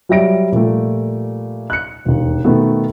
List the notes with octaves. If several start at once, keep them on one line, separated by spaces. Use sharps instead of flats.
F#3 G3 E5 A#6 D7
A#2 F3 G3 A3
F#6 C#7
E1 D#2
B2 D#3 A3 B3